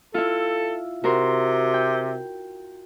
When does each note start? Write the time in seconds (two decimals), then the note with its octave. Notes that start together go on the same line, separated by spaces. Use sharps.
0.14 E4 F4 A4
1.04 C3 F#4 A#4 C6
1.74 G5